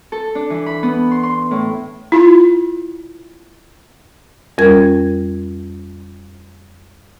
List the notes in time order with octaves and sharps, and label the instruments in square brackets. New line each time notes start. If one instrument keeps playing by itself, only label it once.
[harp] A4
D4
E3
B5
B3
C6
C6
A2
[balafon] E4 F4
[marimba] F2 G3 C#4 A#4 G#6